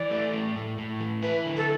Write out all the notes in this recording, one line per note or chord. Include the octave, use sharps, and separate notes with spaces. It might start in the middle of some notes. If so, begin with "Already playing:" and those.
Already playing: E3 D5
A3
A2
A2
A2
E3
E4 B4
D3
A4